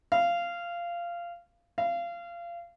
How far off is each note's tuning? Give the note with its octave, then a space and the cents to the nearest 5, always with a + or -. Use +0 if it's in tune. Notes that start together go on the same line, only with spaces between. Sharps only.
F5 -15
F5 -25